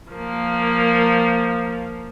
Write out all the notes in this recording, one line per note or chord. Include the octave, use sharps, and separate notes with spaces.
F3 A#3